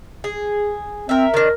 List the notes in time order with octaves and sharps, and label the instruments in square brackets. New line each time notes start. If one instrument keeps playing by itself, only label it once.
[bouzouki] G#4
[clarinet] C4 [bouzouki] A#4 E5
[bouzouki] D#3 D4 [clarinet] A#4